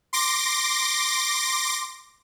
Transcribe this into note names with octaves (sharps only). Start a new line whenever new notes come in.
C6 D6 A#6